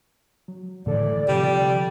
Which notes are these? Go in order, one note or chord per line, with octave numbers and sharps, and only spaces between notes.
F#3
A2 D3 E3 A4 D5
C3 F3 G3